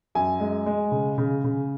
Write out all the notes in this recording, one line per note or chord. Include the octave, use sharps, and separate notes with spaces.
F#2 G#5
G#3
G#3
C#3
C#3
C#3